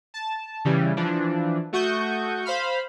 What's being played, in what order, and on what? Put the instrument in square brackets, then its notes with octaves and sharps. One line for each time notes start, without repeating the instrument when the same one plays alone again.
[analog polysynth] A5
C#3 E3 G3
E3 F3 D4
A3 F#4 C#6 D#6 G6
C5 F5 B5 F6